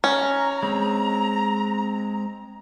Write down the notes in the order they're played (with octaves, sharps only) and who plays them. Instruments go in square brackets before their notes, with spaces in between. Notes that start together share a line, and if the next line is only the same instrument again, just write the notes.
[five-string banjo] C#4 [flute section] A#5
[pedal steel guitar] G#3 C4